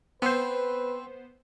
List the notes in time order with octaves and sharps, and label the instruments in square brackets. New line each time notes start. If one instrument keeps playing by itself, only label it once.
[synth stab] B3 C5 [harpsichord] C4 [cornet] B4